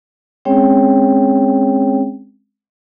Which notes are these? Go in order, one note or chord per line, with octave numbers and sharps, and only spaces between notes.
G#3 C4 C#4 G#4 C#5 G5